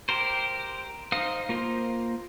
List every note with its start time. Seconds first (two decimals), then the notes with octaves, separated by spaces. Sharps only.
0.09 G4 A#4 C5
1.12 D#4 C5 F5 D#6
1.49 A#3 F4 A#4 C5